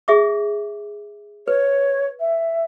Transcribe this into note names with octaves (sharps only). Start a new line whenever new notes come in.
G#4 E5 D6
B4 C#5
E5